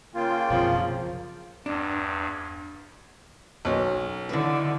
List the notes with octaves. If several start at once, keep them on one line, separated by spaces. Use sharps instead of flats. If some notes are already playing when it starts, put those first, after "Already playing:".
C#3 A#3 F4 G5
F#1 B1 C3 F3
E2 G2 D4
B1 F#3 C#4 A#4
D3 E4 B4